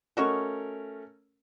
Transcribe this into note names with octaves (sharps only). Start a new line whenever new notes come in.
A3 C#4 F#4 A#4 D#5 C#6